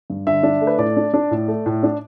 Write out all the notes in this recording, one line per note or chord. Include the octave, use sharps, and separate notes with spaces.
G2
D3 E5
D4
A3
B4
A2 D5
D4
D4
A2
A3
A2
D4